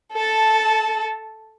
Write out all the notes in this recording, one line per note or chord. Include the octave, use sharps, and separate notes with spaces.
A4 A5